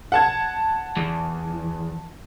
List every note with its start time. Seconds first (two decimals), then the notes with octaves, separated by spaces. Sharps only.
0.12 F#5 A5 G#6
0.97 E2 E3